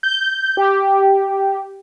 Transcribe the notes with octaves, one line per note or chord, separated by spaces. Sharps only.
G6
G4